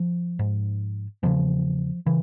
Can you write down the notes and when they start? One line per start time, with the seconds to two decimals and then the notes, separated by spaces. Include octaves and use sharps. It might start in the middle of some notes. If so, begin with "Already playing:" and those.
Already playing: F3
0.39 G#2
1.23 E2 C#3 F3
2.06 C#3 E3